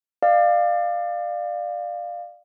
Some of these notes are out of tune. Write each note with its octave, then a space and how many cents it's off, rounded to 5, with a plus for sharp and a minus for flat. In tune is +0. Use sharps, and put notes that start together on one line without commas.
D5 +30 F5 +0